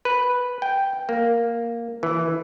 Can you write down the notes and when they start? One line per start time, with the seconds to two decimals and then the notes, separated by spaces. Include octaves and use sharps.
0.05 B4
0.62 G5
1.09 A#3
2.03 E3